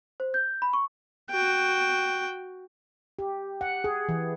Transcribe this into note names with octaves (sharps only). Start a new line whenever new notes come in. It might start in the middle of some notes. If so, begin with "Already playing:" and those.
C5
G6
B5
C#6
F#4 G5
G4
F#5
G#4
E3